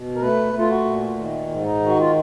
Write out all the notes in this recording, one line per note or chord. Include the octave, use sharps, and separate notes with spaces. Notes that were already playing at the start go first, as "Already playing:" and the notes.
Already playing: B2
A#4
A3 B4
A3
F4
F#4
A#2
D#3
G#2
D#4
D#3
F#4
F4